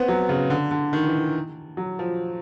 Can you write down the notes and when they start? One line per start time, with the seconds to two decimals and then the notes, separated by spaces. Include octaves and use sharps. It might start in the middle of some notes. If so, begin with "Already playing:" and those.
Already playing: B3 C4
0.08 F#3
0.29 C#3
0.50 D3
0.71 D3
0.93 D#3
1.06 E3
1.77 F#3
1.99 F3